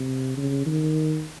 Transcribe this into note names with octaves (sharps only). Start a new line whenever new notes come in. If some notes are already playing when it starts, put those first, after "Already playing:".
Already playing: C3
C#3
D#3